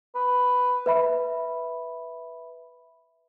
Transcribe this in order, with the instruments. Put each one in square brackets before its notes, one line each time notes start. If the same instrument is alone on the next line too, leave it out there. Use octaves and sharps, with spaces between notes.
[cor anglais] B4
[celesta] B4 E5 B5